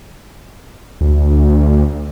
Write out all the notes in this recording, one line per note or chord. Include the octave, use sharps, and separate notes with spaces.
D2